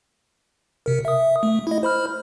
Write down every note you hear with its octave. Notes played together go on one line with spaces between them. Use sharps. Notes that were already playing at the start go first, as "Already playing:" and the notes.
C3 A#4
E5 D#6
A3
E4 D#5
C5 B5 F6